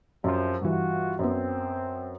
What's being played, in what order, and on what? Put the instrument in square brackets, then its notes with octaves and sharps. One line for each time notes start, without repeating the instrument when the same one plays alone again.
[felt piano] F#2 [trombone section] C3 F3
[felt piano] G2 E3 [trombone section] F4 F#4
[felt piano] F#2 B3 [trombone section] C4